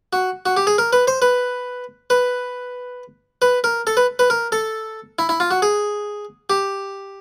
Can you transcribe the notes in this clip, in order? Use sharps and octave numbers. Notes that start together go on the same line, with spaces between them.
F#4
F#4
G4
G#4
A#4
B4
C5
B4
B4
B4
A#4
A4
B4
B4
A#4
A4
E4
E4
F4
F#4
G#4
G4